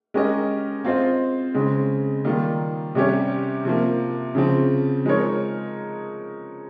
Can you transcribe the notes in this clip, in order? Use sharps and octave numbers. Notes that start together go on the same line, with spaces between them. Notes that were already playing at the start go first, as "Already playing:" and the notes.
G#3 C#4 G4 A#4 D#5
C4 F4 C5 D#5
C#3 G#3 C4
D#3 G3 A#3 F4
C3 G3 C#4 G4 C#5
C3 F3 A#3
C#3 F3 C4
F3 G#3 D#4 A#4 C#5